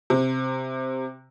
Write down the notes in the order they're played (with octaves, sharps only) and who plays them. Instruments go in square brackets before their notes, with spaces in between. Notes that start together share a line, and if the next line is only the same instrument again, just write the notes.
[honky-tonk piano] C3